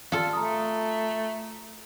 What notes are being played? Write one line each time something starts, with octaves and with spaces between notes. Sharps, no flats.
F4 A4
A3 A#5 D#6